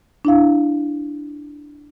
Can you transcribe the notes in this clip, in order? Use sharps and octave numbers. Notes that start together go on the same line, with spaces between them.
D4 E4 F5